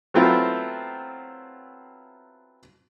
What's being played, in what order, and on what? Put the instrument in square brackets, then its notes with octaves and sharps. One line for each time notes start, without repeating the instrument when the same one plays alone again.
[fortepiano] F#3 A3 B3 C4 E4 F4